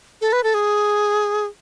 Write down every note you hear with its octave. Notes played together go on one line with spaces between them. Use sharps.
A4
B4
A4
G#4